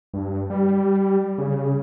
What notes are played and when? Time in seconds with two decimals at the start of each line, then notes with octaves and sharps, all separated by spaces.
0.14 G2
0.50 G3
1.38 C#3